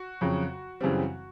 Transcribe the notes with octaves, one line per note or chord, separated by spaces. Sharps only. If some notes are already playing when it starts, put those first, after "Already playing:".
Already playing: F#4
F2 C#3 F#3
F#2 C#3 E3 G3 C4